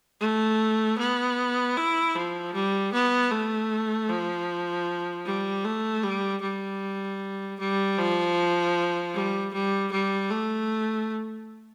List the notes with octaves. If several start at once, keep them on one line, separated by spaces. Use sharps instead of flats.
A3
B3
E4
F3
G3
B3
A3
F3
G3
A3
G3
G3
G3
F3
G3
G3
G3
A3